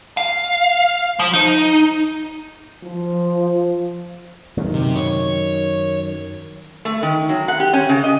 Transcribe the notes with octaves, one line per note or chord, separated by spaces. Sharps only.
F5
F3
D#4
F3
F#2 D#3
C3
C#5
A3
D#3
F#3
F#5
G4
C#4
C#3
D#5